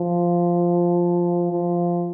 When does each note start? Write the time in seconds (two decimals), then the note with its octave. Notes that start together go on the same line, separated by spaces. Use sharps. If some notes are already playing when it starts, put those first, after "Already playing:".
Already playing: F3
1.52 F3